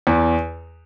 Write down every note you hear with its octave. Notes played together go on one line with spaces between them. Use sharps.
E2